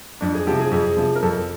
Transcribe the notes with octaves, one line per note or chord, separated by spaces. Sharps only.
F2 D4
G#4
C3 F3 G4
G#4
F2 G#4
C3 F3
A#4
F2 A4